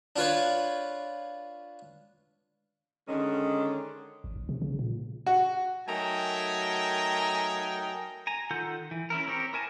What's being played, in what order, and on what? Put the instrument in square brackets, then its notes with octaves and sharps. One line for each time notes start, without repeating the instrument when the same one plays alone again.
[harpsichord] D4 F4 B4 C#5
[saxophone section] D3 D#3 G#3 C#4
[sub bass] A1
A#1
C3
C#3
A#2
[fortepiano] F#4
[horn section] F#3 A3 D#4 A#4 G5 G#5
[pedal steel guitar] G#5 A#5
D#3 F4 A4 F#5 G6
E3
C#4 E4 A#4
C4 G4 A#4 C#5
E4 A#4 G#5 A5